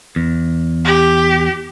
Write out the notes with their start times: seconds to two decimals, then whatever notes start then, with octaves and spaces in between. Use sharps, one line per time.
0.16 E2
0.85 G4